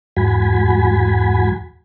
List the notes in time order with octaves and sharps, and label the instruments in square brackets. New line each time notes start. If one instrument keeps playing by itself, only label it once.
[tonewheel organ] E2 G#2 F#4 G#5 B5